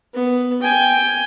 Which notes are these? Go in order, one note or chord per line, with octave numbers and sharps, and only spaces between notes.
B3
G5 G#5